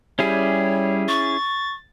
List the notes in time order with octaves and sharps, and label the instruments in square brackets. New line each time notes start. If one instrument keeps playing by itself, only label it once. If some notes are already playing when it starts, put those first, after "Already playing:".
[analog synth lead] G3 [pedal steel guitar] C#4 E4 G#4 [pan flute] C#5
[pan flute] C#6 [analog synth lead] A6